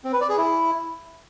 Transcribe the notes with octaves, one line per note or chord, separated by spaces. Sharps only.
C4
B4
D5
G#4
E4